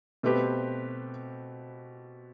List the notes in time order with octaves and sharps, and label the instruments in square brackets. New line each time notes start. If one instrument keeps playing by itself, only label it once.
[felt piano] B2 A3 C4 G4 B4